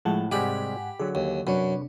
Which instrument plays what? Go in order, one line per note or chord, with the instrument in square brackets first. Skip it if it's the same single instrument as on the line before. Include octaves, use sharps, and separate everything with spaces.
[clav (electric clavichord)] A2 F#5 [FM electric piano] F3 G#3 A5
[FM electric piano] G#2 F#5 G#5 [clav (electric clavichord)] C3 G3 G#3 [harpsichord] G4 B5
[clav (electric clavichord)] D3 F#3 [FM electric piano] G#4
[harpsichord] D#2
[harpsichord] F#2 [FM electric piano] C3 D4 [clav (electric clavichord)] B4 C#5